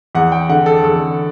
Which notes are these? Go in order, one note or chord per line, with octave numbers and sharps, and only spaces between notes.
E2 F#5
G5
D3 F#5
A4
E2 A4